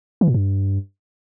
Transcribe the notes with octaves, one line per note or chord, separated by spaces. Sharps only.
E3
A#2
G2